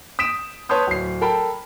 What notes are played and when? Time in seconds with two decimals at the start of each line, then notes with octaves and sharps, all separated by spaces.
0.19 D#6 B6 D7 E7
0.69 B4 C#5 A5 C6 D#6 G6
0.87 D1 C7
1.21 A4 A#4 G5 A5 B5